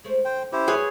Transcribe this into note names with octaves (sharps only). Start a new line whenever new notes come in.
G#3 A3 C5
D2 C5 G5
C#4 E4 G4 C5
F#2 G#3 G#4 B4 C#5